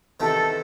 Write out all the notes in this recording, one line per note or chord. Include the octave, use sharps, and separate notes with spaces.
E2 C3 D#3 A4